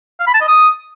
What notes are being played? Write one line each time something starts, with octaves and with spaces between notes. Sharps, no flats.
F5
B5
A5
D#5
D#6